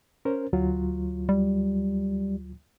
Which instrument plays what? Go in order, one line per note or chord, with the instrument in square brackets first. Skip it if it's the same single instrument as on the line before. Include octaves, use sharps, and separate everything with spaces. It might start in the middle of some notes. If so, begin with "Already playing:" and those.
[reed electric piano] C#4 A#4 C5
D2 F#3 F4
[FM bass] G3